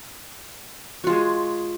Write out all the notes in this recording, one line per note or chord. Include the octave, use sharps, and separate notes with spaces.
G#3 F4 F#4 G#4